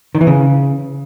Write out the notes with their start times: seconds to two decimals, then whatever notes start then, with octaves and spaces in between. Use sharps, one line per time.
0.15 D#3
0.21 E3
0.27 C#3